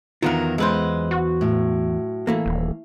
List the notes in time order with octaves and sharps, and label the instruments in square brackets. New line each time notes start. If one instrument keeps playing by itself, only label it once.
[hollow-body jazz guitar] E2 B3 F4 [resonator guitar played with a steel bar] D#3 F#3 A#4
[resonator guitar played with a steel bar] F#2 B4 C5 [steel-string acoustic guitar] G#3
[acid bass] F#4
[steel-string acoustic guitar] A2
[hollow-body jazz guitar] E3 A3 A#3
[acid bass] D#1